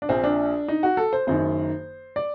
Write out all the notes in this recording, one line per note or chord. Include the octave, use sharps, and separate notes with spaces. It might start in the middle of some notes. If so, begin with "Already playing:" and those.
D4
A#1 A#2 C4
D4
D#4
F#4
A4
C5
F#1 F#2 D#3 C5
D5